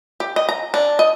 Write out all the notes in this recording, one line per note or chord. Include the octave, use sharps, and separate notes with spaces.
G4
D#5
A#5
D4
D#5